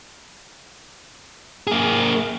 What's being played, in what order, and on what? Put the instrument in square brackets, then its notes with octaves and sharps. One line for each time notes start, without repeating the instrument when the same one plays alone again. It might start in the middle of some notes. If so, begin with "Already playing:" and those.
[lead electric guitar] A#3 G#4